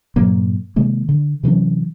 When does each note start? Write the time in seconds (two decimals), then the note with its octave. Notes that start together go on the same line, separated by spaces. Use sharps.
0.16 G2 A#2 F#3 A#3
0.76 C3 D#3 G#3 A#3
1.09 D3
1.43 C3 E3 F#3 C#4